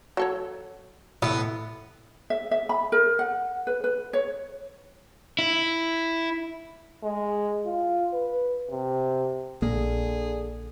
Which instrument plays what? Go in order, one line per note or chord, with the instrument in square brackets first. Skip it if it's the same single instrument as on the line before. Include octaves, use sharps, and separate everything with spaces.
[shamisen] F#3 A4 C#5
[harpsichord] A2 [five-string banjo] B3
[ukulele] E5
E5
B5
A#4
F#5
B4
B4
C#5
[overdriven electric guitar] E4
[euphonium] G#3
F4
B4
C3
[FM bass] A#1 [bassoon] D3 [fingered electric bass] A#3 [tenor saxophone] G#4